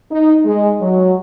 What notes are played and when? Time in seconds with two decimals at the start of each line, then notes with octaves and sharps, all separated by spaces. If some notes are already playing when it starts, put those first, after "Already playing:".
0.11 D#4
0.45 G#3
0.81 F#3